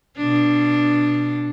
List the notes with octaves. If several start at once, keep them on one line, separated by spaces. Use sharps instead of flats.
B2 D4